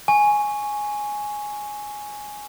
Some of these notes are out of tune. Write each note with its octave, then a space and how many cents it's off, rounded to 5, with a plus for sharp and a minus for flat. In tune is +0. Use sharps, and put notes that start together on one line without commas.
G#5 +0 C#6 +0